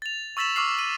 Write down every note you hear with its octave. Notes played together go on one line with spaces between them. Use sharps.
A6 F7
C#6 E6 A6 B6 E7 F#7
C#6 D6 E6 F6 C7
D#7